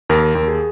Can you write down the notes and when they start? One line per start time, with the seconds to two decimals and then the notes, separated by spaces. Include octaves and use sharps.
0.10 D#2 A#4
0.35 D#2
0.48 G#4